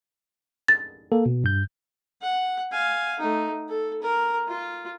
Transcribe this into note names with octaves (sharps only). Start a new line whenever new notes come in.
A6
A#3 A4
B2
G2 G6
F#5
F5 G#5
A3 D#4
A4
A#4
F4